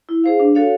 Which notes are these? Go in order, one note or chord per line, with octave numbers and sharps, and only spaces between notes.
E4
G#4 C5 F5
D4
F#4 A4 C#5 F5